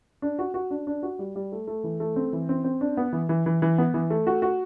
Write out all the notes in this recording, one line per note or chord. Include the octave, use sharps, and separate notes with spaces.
D4
F#4
F#4
D4
D4
F#4
G3
G3
A3
A3
E3
A3
C4
E3
C4
C4
D4
B3
E3
E3
E3
E3
B3
E3
A3
F#4
F#4